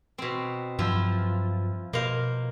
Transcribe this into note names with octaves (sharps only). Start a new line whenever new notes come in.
B2 C4
G2 F3 F#3 E4 F4
B2 A#3 C5 F5